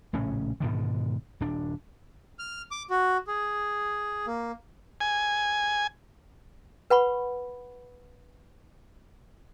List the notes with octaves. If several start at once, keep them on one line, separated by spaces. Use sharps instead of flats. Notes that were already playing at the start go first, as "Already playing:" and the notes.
A#1 A2 C#3 C#4
G#2 B2 D3 D#3
D#1 D4
F6
D6
F#4
G#4
A#3
G#5
B4 F#5 B5 C#6